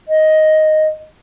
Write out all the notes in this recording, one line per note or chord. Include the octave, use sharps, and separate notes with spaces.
D#5